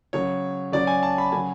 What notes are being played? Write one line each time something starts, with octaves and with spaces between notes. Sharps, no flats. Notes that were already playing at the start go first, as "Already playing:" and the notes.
C#3 F#3 C#5
C#3 F#3 D5
G#5
A5
B5
C#3 F#3 G#5